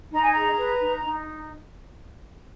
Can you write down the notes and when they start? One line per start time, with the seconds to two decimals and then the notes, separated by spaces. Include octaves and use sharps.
0.11 D#4 A#5
0.21 G#5
0.31 G#4 A#5
0.57 B4
0.80 D#4
1.04 D#4